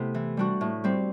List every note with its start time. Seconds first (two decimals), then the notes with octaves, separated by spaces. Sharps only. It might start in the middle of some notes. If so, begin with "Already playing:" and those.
Already playing: C3 A3 B3 E4 A4
0.14 E3
0.37 G3 D4 F#4
0.61 A2
0.84 G3 C4